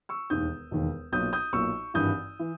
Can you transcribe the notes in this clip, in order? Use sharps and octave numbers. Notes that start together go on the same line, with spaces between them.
C#6 E6
E1 D#2 D#3 D#6 G6
E1 D#2 D#3
B1 A#2 D#6 G6
D#6 G6
B1 A#2 C#6 E6
G#1 G2 E3 D#6 G6
E3